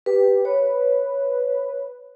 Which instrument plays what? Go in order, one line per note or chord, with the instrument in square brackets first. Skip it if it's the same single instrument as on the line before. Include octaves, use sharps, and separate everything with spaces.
[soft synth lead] G4 [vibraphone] B4
[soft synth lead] B4 [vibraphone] C#5